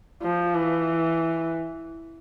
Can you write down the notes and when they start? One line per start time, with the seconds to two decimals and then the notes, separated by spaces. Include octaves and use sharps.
0.23 F3
0.55 E3